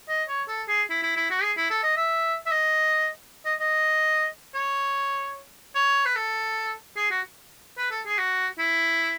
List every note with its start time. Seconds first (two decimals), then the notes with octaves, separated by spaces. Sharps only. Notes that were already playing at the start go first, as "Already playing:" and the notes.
0.09 D#5
0.28 C#5
0.48 A4
0.68 G#4
0.90 E4
1.03 E4
1.16 E4
1.30 F#4
1.43 G#4
1.57 E4
1.70 A4
1.83 D#5
1.97 E5
2.46 E5
2.51 D#5
3.45 D#5
3.60 D#5
4.54 C#5
5.75 C#5
6.05 B4
6.16 A4
6.97 G#4
7.11 F#4
7.78 B4
7.91 A4
8.06 G#4
8.18 F#4
8.59 E4